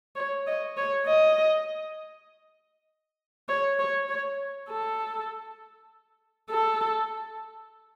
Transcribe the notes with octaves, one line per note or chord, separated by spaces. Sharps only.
C#5
D#5
C#5
D#5
C#5
C#5
C#5
A4
A4